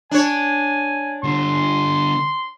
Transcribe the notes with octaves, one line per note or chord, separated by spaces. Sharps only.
D4 C#5 G#5
D3 G3 C6